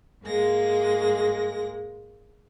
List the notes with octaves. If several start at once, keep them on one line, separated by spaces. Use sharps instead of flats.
G#2 G#3 A#3 A#6